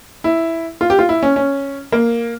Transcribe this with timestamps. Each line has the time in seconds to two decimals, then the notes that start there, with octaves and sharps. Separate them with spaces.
0.24 E4
0.81 F4
0.90 G4
0.99 F4
1.09 E4
1.23 C#4
1.36 C#4
1.92 A#3